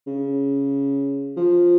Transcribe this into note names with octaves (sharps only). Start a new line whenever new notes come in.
C#3
F3